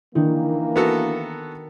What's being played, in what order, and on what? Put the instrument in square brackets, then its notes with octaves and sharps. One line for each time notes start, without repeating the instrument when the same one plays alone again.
[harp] D#3 [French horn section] E3 A#3 [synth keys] D4 E4
[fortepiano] B3 F#4 A4 [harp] A#4